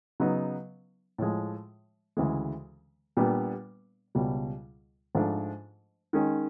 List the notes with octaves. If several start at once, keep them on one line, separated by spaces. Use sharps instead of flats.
C#3 F#3 B3 D#4
A2 F3 G#3
D2 C#3 E3 G#3
A#2 G3 B3 D4
C#2 B2 G3
G#2 F3 A3 D4
D#3 G#3 C#4